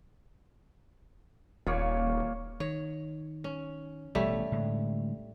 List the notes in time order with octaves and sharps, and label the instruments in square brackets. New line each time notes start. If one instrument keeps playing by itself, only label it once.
[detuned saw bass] D#1 [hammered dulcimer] A#2 A#3 C#5
[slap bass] D#3 [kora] C#5
[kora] C#4
[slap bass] A1 B2 [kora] G3 A3 C#5
[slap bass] A2 D3 G#3